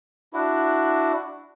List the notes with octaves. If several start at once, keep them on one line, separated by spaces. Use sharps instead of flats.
D4 E4 F#4